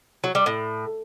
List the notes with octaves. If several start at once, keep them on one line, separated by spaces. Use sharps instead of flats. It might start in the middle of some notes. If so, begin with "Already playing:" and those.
F#3
G3
A2